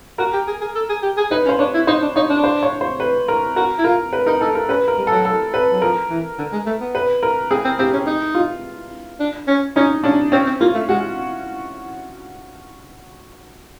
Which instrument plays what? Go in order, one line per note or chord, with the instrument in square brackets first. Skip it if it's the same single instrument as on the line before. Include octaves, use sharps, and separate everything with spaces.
[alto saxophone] F#4 [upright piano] A#4
[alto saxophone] G4
G#4
G#4
A4
G#4
G4
G#4
[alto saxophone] D#4 [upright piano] B4
[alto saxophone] C#4
[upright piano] C5
[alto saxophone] D4 [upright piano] C#5
[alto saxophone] E4
[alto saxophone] D#4 [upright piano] C5
[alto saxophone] D4
[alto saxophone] D#4 [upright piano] C#5
[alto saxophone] D4
[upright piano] C5
C#5
C5
B4
A#4
[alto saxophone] F#4 [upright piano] A#4
[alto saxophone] E4
[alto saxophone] F4 [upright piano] A#4
[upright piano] B4
[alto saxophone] D#4 [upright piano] A#4
[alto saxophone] D#4 [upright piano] A4
[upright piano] A#4
[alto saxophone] C#4 [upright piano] B4
[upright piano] A#4
[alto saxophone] G3
[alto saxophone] F#3 [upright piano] A4
[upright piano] A4
B4
[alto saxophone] F#3
[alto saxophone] F3 [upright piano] A#4
[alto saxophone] E3
D3
G#3
A3
B3
[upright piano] B4
A#4
[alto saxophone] C4 [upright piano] G#4
[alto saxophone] C4
[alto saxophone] C4 [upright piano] G4
[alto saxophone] C#4
D#4
[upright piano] F4
[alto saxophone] D4
C#4
[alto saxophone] C#4 [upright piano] D#4
[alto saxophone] C#4 [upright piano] D4
[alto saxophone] C4 [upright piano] C#4
[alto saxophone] C4
[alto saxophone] A#3 [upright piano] F4
[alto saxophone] A3
[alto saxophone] G#3 [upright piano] F#4